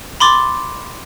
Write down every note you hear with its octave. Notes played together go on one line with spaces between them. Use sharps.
B5 C6 D6 A6